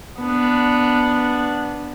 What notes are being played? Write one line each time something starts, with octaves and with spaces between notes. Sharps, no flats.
B3 D4